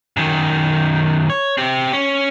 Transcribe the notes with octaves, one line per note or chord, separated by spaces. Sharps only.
F#2 D#3
C#5
C4 G4
C#4